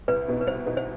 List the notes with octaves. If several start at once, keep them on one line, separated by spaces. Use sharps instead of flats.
C2 B4
B2 B3 D#4
B4
C2 C5
B2 B3 D#4
C5